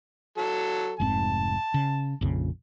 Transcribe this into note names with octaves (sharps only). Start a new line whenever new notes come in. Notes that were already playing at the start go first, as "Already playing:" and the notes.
F#3 A4
F1 G#2 C4 A5
C#3
A#1 F2 C#3